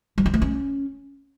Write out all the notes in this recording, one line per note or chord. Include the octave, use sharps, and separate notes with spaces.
G3
C4
A3
C#4